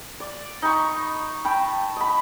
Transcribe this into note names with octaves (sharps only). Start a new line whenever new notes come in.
D5
D#4 B5 C#6
G5 A5 B5
D#5 B5